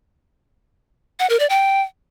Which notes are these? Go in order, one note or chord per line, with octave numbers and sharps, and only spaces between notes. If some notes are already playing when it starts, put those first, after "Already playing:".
F#5
A#4
D5
G5